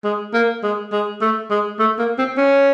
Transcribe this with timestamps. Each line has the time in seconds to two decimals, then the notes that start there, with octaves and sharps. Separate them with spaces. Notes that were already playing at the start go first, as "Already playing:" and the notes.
0.04 G#3
0.34 A#3
0.63 G#3
0.92 G#3
1.21 A3
1.50 G#3
1.79 A3
1.99 A#3
2.18 C4
2.38 C#4